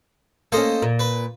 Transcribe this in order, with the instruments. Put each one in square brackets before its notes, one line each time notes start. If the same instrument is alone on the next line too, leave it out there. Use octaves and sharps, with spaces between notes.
[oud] A#3 C#4 [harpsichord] A4 C5 D#5
[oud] A#2
[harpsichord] B4